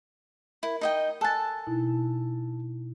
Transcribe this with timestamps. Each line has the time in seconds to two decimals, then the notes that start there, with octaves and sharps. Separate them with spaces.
0.63 E4 A#4
0.81 D#4 D#5 G5
1.21 A4 G#5 A5 F#6 A6
1.67 B2 D#4 E4